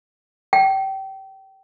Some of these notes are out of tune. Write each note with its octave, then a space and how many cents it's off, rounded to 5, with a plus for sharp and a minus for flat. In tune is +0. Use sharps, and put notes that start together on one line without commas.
G5 -25